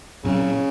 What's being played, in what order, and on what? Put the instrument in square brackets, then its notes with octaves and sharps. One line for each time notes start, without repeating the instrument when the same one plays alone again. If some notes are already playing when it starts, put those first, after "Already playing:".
[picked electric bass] A#2 F#3 C4 [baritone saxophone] C#3